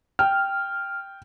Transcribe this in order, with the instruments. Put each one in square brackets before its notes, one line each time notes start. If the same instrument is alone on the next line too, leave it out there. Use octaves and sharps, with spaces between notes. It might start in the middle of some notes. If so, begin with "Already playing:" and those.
[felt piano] G5 [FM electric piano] F6